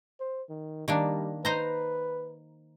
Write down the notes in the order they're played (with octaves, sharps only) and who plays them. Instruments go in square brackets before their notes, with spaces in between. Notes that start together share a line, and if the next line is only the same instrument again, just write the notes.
[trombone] C5
D#3
[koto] D#3 A#3 D4 [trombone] G3
[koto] D#4 C5 A#5 [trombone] B4